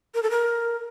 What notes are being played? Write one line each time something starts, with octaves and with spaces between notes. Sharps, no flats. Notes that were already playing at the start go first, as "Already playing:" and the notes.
A#4
A4
A#4